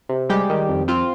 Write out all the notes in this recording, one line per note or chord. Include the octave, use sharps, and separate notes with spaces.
C3
G3 G#3 G4
D#3
F2
C4 F4